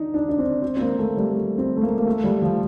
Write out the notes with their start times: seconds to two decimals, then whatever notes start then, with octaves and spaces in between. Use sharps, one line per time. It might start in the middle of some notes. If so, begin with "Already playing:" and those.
Already playing: D4 D#4
0.14 D4
0.29 D4
0.38 C4
0.62 C4
0.77 C4
0.80 A#3
0.99 A3
1.17 G3
1.34 A3
1.58 C4
1.77 A3
1.82 A#3
1.97 A#3
2.07 A3
2.24 G3
2.42 F3